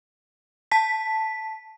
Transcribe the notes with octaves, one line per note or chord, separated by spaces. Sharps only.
A5 B6